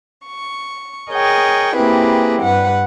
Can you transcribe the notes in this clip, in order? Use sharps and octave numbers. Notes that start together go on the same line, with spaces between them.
C#6
G#4 A#4 C#5 D#5 G5
A#3 C4 E4 G4 G#4 B4
G2 B4 F#5